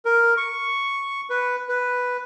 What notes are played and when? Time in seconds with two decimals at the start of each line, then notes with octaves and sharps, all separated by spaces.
0.05 A#4
0.37 C#6
1.30 B4
1.69 B4